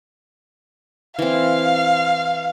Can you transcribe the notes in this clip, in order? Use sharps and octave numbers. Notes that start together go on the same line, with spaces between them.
E3 C4 F5